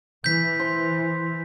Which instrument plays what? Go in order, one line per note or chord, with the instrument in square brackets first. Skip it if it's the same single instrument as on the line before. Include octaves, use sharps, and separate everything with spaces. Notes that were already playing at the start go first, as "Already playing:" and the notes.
[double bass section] E3 [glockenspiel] G6 B6
[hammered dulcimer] C5